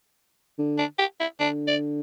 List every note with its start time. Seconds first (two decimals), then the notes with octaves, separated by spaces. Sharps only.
0.59 D3
0.78 D4
0.99 G4
1.20 E4
1.40 D3 D4
1.68 D5